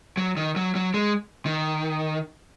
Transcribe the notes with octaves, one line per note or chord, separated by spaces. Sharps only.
F#3
D#3
F#3
F#3
G#3
D#3